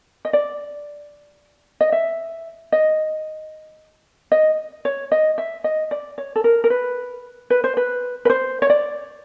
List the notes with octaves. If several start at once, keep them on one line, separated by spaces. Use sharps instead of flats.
D#5
D5
D#5
E5
D#5
D#5
C#5
D#5
E5
D#5
D5
C#5
A4
A#4
A#4
B4
B4
C5
B4
B4
C5
C#5
D5